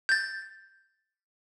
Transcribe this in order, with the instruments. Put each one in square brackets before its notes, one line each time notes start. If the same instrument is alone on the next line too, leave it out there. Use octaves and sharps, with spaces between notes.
[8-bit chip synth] G6 A6